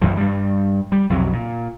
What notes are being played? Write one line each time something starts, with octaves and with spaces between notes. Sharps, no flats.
A1 F#2 E3 F3
G2 G3
G3
B1 F2 C3 F#3
A#2